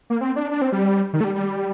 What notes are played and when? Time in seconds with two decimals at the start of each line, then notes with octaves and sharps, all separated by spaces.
0.10 A#3
0.21 C4
0.36 D4
0.51 D4
0.62 C4
0.72 G3
1.13 D#3
1.21 A3
1.24 G3
1.35 G3